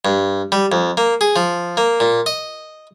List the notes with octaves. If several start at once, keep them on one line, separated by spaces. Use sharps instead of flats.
G2
G3
F2
A#3
G#4
F3
A#3
A#2
D#5